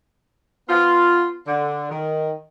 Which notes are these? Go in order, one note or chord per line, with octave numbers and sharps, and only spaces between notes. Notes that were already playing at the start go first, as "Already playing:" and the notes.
B3 F4
D3
D#3